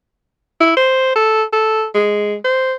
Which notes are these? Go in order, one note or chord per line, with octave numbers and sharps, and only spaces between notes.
E4
C5
A4
A4
G#3
C5